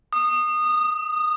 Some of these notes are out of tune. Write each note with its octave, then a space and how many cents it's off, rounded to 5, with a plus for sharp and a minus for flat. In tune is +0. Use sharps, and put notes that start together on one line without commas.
D#6 -20
D#6 +20